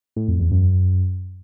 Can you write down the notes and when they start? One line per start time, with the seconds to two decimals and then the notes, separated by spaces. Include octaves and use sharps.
0.16 A2
0.28 F2
0.40 E2
0.51 F#2